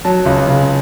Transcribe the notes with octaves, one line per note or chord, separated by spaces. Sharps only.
F#3 A5
C#2
C#3